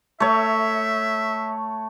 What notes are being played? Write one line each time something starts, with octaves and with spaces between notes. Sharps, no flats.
A3 C#5 E5